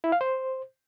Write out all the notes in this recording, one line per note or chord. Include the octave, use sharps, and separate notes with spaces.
E4
F5
C5